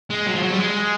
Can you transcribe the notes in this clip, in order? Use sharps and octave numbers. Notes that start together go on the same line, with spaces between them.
G#3
F#3
F3
F#3
G3
G#3